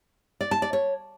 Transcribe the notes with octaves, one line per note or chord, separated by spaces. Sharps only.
D5
A5
D5
C#5